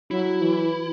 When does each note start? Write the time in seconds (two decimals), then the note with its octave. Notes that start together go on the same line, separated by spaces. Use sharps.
0.11 F#3 E4
0.42 E3